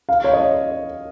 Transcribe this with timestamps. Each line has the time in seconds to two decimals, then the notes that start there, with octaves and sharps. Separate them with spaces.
0.09 F5
0.24 C#5
0.33 D#5
0.40 C#5